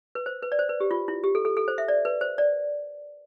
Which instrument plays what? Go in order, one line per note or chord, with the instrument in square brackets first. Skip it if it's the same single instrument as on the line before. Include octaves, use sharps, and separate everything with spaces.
[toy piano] B4
C5
B4
D5
C5
B4
G4
F4
E4
G4
A4
A4
A4
C5
E5
D5
B4
C5
D5